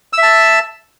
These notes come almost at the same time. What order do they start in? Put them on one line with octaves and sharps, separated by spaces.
E6 E5 A5